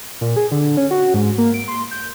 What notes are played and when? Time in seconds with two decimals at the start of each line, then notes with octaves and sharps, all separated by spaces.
0.21 A#2
0.36 G#4
0.51 D3
0.77 C#4
0.91 F#4
1.14 G#2
1.38 A#3
1.54 D7
1.68 C6
1.91 G6